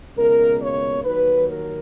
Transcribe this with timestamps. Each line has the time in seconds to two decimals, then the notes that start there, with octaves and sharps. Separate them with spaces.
0.16 C#2 B2 A#3 A#4
0.60 C#5
1.04 D#2 D#3 F#3 B4
1.49 A#4